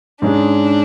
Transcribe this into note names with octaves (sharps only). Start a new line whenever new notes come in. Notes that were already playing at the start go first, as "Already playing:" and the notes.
G#2 G#3 C#4 D4 G#4